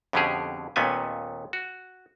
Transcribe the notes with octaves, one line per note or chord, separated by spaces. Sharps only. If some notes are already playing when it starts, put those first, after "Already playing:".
F2 B2 D3 C#4 G4 G#4
D#2 A#2 A3 B3 C#4 G#5
F#4